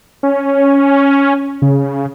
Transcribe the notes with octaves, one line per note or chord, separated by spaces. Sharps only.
C#4
C#3